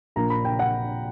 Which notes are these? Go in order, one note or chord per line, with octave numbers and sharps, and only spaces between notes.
A#1 A#2 A#3 A#5
B5
G5
F#5